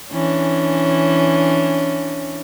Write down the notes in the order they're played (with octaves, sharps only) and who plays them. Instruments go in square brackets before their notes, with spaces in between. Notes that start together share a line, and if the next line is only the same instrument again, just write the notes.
[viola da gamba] E3 C#4 D4